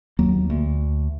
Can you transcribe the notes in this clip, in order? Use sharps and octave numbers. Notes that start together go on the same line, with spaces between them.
D#2 F#3 A#3
D2